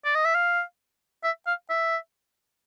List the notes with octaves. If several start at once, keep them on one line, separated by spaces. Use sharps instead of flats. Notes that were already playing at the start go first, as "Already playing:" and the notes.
D5
D#5
E5
F5
E5
F5
E5